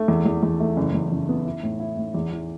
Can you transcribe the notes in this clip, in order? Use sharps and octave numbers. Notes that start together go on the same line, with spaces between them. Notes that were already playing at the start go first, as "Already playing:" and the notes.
Already playing: A3
E2
E2
E2
A3
F#1
E2
F#1
B3
E4
A2
E4
A2
E2
E3